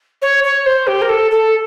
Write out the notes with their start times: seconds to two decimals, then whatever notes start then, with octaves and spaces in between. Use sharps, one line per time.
0.22 C#5
0.44 C#5
0.66 C5
0.87 G4
1.02 A#4
1.09 A4
1.31 A4